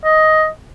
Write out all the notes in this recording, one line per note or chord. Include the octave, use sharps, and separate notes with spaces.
D#5